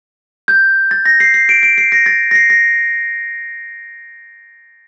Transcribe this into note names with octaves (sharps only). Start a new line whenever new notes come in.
G6
A6
A#6
C7
C7
D7
D7
C7
A#6
A6
A#6
C7
A#6